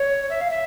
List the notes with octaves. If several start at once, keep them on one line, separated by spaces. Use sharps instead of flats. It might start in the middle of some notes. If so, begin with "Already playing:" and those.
Already playing: C#5
E5
F5
E5